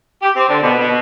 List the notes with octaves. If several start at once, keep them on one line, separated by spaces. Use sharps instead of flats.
G4
C4
D3
B2
B2